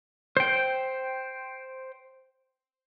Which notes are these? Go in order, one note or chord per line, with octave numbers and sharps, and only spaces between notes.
C5 G5